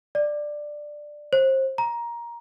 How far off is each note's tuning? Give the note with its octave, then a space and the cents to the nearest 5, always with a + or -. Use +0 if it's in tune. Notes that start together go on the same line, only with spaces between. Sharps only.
D5 +10
C5 +30
A#5 +15